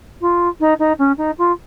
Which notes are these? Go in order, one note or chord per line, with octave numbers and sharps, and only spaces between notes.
F4
D#4
D#4
C#4
D#4
F4